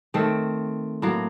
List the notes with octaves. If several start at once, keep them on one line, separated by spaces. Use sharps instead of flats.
D#3 A3 C4
A2 F#3 A#3